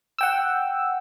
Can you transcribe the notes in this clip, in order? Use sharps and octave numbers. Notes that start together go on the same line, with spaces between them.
F#5 G5 E6